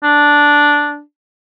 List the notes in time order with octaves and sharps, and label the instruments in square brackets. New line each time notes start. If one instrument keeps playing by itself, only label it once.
[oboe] D4